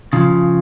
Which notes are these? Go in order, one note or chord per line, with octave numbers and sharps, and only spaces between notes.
C#3 F3